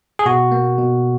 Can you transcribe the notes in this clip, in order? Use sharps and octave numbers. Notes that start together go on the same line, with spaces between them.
G#4
B2 F#4
A#3
B2